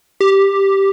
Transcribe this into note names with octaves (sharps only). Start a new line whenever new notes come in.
G4